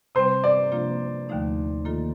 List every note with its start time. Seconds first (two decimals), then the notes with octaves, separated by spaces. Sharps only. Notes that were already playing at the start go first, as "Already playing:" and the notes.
0.15 C3 G3 C4 C5
0.44 D5
0.72 C3 F3 A#3 D4 F4
1.29 D#2 D3 F3 A3 D#4
1.85 D#3 A#3 F4 A4